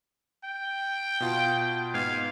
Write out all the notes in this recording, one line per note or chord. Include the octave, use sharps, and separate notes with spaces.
G5
B2 F4
G#2 B3 F5 G#6